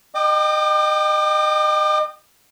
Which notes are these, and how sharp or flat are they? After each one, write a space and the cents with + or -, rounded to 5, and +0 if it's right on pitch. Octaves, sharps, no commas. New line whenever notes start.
D#5 -25 G5 +0 D6 +40